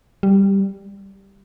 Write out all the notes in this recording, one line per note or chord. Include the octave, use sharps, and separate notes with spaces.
G3